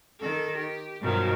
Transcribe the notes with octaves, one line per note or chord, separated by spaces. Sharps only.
D#3 A4
G4
G2 B2 D#3 F3 F#3